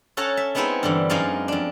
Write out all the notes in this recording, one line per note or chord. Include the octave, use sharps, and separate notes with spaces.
C#4 A4 C#5 F#5 A5 A#5
E5
G#3 B3 C4 D#4 E4 G#4
G2 D3 E3
F#2 G#3 D#4 D5 F5
F2 D4